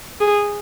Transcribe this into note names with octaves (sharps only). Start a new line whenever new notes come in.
G#4